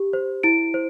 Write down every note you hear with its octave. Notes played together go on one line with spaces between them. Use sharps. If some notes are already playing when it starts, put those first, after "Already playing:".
Already playing: G4
C5
E4 D7
C5